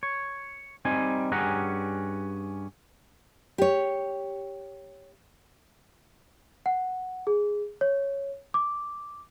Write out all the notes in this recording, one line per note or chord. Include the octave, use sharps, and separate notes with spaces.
C#5
G3 C4 D#4 G#5
G2 C#4 G4 G#4 F#5 A#5
G4 C#5
F#5
G#4
C#5
D6